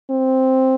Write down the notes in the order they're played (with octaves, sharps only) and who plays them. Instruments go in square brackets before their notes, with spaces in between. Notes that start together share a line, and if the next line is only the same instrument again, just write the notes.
[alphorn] C4